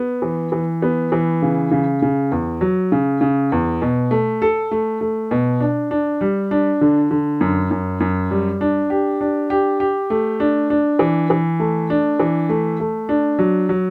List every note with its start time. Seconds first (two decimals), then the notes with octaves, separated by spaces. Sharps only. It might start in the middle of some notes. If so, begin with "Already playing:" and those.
Already playing: B3
0.22 E3
0.52 E3
0.82 B3
1.12 E3
1.42 C#3
1.71 C#3
2.02 C#3
2.32 E2
2.61 F#3
2.92 C#3
3.21 C#3
3.52 E2
3.82 B2
4.11 A3
4.42 A4
4.71 A3
5.01 A3
5.31 B2
5.60 D4
5.91 D4
6.21 G3
6.51 D4
6.81 D3
7.11 D3
7.41 F#2
7.71 F#2
8.00 F#2
8.30 G3
8.61 D4
8.90 G4
9.21 D4
9.50 G4
9.80 G4
10.10 A3
10.40 D4
10.70 D4
10.99 E3
11.30 E3
11.60 A3
11.90 D4
12.20 E3
12.49 A3
12.80 A3
13.09 D4
13.39 F#3
13.69 F#3